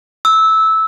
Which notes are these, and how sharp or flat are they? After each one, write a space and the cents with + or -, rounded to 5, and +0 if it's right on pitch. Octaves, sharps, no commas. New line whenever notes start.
E6 -15